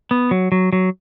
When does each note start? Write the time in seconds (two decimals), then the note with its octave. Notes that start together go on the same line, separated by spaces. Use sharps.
0.11 B3
0.31 F#3
0.52 F#3
0.73 F#3